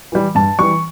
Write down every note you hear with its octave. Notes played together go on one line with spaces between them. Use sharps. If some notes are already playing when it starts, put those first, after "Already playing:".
E3 G3
G2 A5
E3 G3 C#6